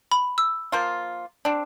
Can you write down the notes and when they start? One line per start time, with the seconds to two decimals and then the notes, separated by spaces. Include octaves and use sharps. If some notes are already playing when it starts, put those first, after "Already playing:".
0.12 B5
0.38 E6
0.72 F3 A#3 F4
1.45 C4 D4